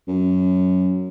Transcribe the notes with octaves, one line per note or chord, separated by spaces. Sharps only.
F#2